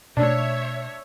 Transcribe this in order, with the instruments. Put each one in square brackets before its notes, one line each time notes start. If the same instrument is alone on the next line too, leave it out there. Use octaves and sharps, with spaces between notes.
[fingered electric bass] B2 A3 [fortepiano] D4 [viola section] C#5 E5